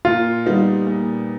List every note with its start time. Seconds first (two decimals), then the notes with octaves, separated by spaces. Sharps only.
0.05 A#2 F4
0.46 G3 B3 D#4
0.87 A#2